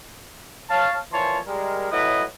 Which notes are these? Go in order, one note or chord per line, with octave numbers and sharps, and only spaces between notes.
C#5 F5 A5
A#2 E3 F3 C#5 A5 C6
G3 G#3 A#4
A2 F#3 E4 B4 D#5